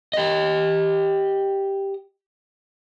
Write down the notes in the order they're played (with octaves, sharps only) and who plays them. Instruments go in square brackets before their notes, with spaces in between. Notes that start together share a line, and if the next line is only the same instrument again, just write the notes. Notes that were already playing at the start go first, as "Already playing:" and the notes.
[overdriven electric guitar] G4 D#5